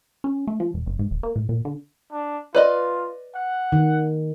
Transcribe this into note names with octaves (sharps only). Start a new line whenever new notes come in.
C#4
A3
F3
E1
F#1
G#2
D#1
A#3
A2
A#2
D3
D4
F4 B4 D5 D#5
F#5
D#3